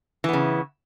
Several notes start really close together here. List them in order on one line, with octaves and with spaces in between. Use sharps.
E3 B3 C#3